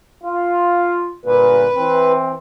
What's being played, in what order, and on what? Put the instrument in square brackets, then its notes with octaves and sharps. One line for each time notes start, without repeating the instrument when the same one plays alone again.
[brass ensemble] F4
[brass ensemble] G1 A#2 [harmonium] B4
[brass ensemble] E3 C4